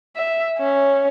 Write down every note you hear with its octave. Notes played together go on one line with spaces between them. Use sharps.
E5
C#4